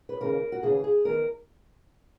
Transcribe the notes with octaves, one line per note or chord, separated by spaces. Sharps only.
B4
D#2 C#3 E3 A#4
F#4
D#2 C#3 E3 G#4
G#4
E2 D#3 A#4